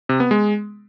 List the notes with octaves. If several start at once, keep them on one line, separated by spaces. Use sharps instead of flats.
C3
B3
G#3